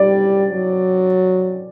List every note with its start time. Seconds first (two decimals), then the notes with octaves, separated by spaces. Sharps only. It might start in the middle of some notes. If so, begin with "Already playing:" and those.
Already playing: G3 D5
0.53 F#3